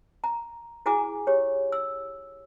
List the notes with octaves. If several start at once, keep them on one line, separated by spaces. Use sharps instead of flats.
A#5
E4 F#4 G#4 G#5 A#5 D6
G4 C#5
E6